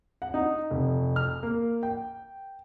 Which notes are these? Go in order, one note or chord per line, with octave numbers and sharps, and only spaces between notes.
F#5
D#4
F1
F6
A#3
G5